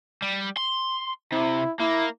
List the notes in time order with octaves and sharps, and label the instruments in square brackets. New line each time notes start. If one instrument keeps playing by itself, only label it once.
[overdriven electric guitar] G3
C6
[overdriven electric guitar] C3 [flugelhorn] E4
[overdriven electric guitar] A#3 [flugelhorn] E4